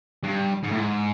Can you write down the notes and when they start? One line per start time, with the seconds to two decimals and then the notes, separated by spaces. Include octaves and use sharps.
0.23 G2
0.64 G#2
0.72 A2
0.80 G#2